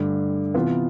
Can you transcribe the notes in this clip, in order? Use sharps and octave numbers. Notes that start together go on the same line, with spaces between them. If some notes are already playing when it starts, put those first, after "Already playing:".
Already playing: G2 D3 A3 D4
C3 E3 B3 F4 B4